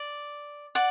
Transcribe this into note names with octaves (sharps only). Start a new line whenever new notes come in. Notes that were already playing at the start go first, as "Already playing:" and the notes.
Already playing: D5
D5 F#5